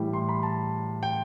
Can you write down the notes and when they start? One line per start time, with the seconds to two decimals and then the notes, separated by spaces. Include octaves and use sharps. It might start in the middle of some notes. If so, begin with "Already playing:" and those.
Already playing: A2 E3 G3
0.13 C6
0.29 B5
0.43 A5
1.03 G5